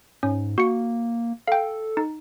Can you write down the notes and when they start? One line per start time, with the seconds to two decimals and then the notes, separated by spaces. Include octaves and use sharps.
0.23 G#2 C#4
0.58 A#3 F#4 C#7
1.48 A4 F5 G5
1.97 D#4